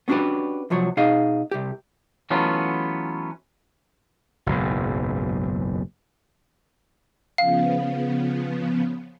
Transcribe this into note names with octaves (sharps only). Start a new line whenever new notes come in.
B3 C#4 D4 F#4 G4 B4
C2 F3 F#3 C#5
B2 D#4 G#4 D#5 F5
C2 G4
E3 F#3 A3 B3 C#4 F4
F#1 B1 G#2
C#3 F3 B3 F5